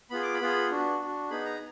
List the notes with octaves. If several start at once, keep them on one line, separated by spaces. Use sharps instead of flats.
B3 F4 G#4 B5
D6
B5
B3 F4 G#4
D4 F#4
D4 F#4
B3 D#4 G#4 B5
A#5